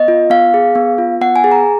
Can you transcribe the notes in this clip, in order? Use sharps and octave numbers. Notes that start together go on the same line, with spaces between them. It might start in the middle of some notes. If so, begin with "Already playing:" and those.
Already playing: B3 D#5
F4
B3 F5
G#4
B3
F4
B3 F#5
G#5
G#4
A#5